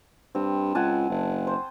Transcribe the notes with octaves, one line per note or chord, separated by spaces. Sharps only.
G2 C4
C#2 F#5 G#5 A5
F#1
C5